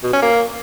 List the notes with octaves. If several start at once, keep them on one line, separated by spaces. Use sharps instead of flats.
B2
C#4
A#3